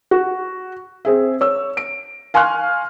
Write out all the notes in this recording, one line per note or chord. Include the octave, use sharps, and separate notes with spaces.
F#4
C4 G#4 E5
C#5 E6
D7
F5 G#5 C6 C#6 F6 F#6